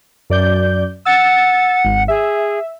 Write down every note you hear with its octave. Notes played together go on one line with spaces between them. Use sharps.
F#2 D5 G6
F#5 E6 A6
G#1
G#4 E5